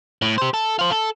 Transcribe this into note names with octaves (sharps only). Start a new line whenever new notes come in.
A2
G4 C5
A4
F4 C5
A4